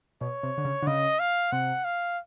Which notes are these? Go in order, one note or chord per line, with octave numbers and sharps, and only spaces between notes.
B2 C#5
C3
D3
C#3
D3
C#3 D#5
F5
C3 F#5
F5